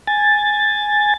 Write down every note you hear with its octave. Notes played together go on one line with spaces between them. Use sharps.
G#5 A6